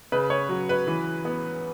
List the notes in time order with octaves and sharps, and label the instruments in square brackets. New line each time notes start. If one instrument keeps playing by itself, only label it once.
[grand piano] C#3 B4
C#5
F#3
B4
E3
B3